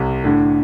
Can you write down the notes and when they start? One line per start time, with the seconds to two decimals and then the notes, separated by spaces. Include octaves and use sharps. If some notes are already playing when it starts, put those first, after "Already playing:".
Already playing: C2 C3
0.24 A2 D3